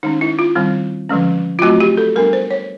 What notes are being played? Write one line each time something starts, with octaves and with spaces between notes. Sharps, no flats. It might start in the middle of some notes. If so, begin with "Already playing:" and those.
D#3 G#3 C#4 D#4
E4
F4
D#3 G3 C4
D3 F3 G#3 C#4
F4
F#3 A3 C4 F#4
G4
A4
G3 B3 D4 A#4
C5
C#5